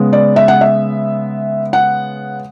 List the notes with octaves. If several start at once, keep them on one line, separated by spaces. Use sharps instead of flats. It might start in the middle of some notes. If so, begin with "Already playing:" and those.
Already playing: C#3 G#3 B3
D5
E5
F#5
E5
F#5